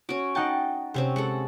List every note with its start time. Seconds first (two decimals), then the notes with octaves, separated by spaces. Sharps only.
0.09 C#4 F#4 D7
0.35 D#4 D#5 F#5 G5 A5
0.94 C3 C4 C#4 C5
1.16 G#3 A4 F#5